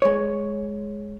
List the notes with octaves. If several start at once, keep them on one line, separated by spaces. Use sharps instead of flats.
G#3 C#5